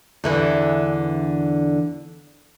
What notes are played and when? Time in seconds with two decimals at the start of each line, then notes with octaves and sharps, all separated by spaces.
0.24 E2 D3 E3